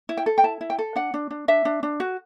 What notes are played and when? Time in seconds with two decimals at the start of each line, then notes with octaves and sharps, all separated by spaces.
0.09 E4
0.17 G5
0.26 A4
0.38 G5
0.44 E4 A5
0.61 E4
0.70 G5
0.79 A4
0.96 D4 F#5
1.14 D4
1.31 D4
1.48 D4 E5
1.65 D4
1.83 D4
2.00 F#4